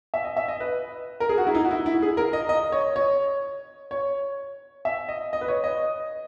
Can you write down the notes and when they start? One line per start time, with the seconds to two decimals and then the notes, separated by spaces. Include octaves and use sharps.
0.14 E5
0.24 D#5
0.37 E5
0.48 D#5
0.60 B4
1.20 A#4
1.29 G#4
1.38 F#4
1.47 E4
1.55 D#4
1.65 F#4
1.71 E4
1.86 E4
2.02 G#4
2.17 A#4
2.33 D#5
2.49 D#5
2.72 C#5
2.96 C#5
3.91 C#5
4.85 E5
5.09 D#5
5.33 D#5
5.41 B4
5.48 C#5
5.64 D#5